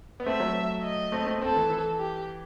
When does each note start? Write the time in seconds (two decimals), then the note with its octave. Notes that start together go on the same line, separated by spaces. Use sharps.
0.20 B3
0.26 A3 C4 E5
0.40 F#3 A3
0.84 D#5
1.12 A3 C4
1.26 A3 C4
1.41 A3 C4 A4
1.56 E3
1.70 E3
1.99 G4